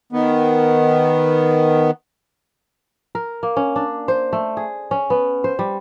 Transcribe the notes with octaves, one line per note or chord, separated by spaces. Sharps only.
D#3 B3
A#4
A#3
C#4
D4
C5
A3
G#4
C#4
B3
C5
G3